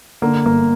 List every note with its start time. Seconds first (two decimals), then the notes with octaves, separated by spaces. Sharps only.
0.22 D3 A#3
0.45 G1 A#3